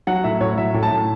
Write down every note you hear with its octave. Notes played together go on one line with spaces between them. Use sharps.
F#3 F#5
A2 E5
A2 C#5
F#3 E5
A2
A5
A2